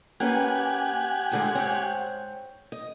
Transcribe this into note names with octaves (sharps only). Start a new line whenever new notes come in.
A#3 C#4 G4 B4 F#5 G#5
D2 D3 G#3
G#2 C4 C#5
D#5